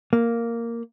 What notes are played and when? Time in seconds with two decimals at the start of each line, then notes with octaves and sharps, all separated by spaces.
0.13 A#3